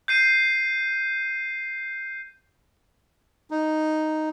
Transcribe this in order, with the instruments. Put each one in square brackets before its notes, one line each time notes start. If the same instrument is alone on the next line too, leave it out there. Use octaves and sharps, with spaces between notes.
[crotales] G6 C7 D#7
[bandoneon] D#4